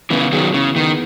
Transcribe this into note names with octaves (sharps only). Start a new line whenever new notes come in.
C#3 E3 B3
D#3 F#3 G#4
C#3 E3
D#3 B3